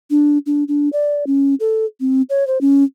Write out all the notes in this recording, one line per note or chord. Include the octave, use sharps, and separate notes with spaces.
D4
D4
D4
D5
C#4
A4
C4
C#5
C5
C#4